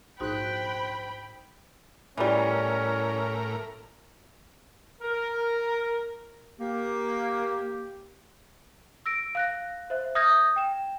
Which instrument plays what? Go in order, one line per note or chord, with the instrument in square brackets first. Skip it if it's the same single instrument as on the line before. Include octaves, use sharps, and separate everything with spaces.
[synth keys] A#1 F#6 [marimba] G#2 D#4 F#4 [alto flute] C5 [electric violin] G5 B5
[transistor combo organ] A2 A#4 [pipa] E3 G3 [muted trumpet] C#4
[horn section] A#4
[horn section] A#3 [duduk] G4
[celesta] E6 A#6 D7
F5 F#6 A#6
C5 E5 F#6
E5 D#6 F6 G6 G#6 A#6
G5 E7